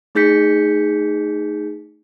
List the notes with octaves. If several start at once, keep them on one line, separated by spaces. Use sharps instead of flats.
A3 D#4 G#4 G6 B6 C#7